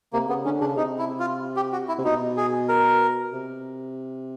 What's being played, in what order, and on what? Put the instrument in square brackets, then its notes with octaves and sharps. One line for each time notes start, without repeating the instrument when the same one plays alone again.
[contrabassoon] C3 [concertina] A#3
[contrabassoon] C#3 [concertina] B3
[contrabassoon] D3 [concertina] C#4
[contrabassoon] C#3 [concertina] D4
[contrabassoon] C3 [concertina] D#4
[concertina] E4
F4
G4
F#4
E4
[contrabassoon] C3
[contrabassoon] B2 [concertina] D#4
[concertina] G#4
A#4
[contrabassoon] C3